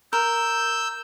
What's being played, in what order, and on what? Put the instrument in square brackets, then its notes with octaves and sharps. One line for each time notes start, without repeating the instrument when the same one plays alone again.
[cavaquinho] A#4 [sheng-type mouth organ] E6 G6